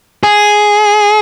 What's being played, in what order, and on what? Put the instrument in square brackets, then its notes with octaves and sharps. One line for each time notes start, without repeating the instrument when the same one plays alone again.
[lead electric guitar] G#4